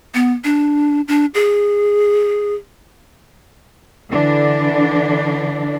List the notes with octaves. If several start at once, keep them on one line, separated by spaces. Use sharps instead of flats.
B3
D4
D4
G#4
D3 E3 D4